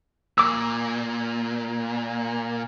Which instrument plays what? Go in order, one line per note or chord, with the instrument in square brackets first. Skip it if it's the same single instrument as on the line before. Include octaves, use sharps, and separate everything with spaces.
[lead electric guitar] A#2 [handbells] D6 E6